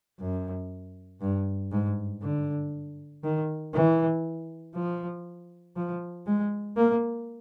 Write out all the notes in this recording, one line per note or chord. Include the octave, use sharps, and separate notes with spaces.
F#2
G2
G#2
D3
D#3
E3
F3
F3
G#3
A#3